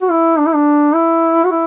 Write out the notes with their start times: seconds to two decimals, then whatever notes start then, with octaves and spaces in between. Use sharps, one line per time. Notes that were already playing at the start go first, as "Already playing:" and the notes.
0.02 F#4
0.11 E4
0.39 D4
0.47 E4
0.55 D4
0.95 E4
1.44 F#4
1.51 E4